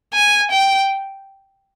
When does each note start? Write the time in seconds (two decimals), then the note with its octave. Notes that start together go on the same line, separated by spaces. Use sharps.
0.14 G#5
0.52 G5